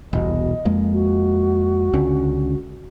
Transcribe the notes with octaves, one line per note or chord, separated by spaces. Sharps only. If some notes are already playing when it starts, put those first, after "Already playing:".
E1 C2 B2 D#5
F2 G#3 A#3
F#4
C#2 D3 C#4